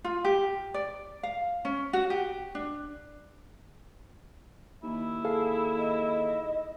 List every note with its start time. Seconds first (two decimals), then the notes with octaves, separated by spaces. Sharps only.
0.04 F4
0.25 G4
0.74 D5
1.23 F5
1.65 C#4
1.93 F#4
2.10 G4
2.55 D4
4.83 D#2 E4
5.25 G#4 A4 F5
5.77 D#5